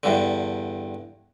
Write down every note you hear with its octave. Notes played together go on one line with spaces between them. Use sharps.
E2 G2 D3